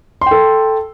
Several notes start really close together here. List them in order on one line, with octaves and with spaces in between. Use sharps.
C6 G5 A4